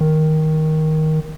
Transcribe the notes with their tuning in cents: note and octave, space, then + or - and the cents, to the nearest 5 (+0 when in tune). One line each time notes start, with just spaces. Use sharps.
D#3 +10